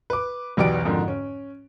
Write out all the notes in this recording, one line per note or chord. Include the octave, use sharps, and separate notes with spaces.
B4 D6
B1 E2 B3 G4 D5 D7
F2 G#2 D3 D#3
C#4